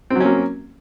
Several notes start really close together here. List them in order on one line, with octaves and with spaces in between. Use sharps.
C4 F#3 C#4 A#3